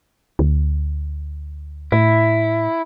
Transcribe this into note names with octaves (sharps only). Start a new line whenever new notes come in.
D2
A2 E4